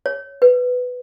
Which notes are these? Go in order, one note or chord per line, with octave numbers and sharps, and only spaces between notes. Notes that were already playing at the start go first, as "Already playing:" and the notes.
C#5
B4